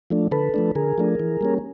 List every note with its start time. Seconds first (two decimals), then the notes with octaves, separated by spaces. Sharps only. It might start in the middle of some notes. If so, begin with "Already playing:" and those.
0.10 F3 A3 D4
0.31 D3 A4 B4
0.54 F3 A3 D4
0.75 D3 G#4 A#4
0.98 F3 A3 D4
1.20 E3
1.41 G3 A#3 C#4